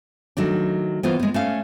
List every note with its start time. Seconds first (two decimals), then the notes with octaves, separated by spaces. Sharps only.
0.37 D#3 F#3 A3 D4
1.03 E3 B3 F4 C5
1.19 G#3 B3
1.34 A3 C#4 F5